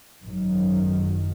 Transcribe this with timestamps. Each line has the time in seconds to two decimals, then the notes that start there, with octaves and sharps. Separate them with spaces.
0.23 G#1 F#2 D#3 F#3